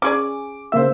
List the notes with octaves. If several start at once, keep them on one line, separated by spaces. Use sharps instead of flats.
C#4 G#4 D5 D6
C#3 A#3 C5 E5 E6